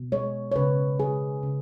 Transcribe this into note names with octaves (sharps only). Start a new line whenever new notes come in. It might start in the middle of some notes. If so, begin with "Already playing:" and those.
Already playing: B2
G#3 C#5
C#5
C#3 B4
G#3 G#4
C#3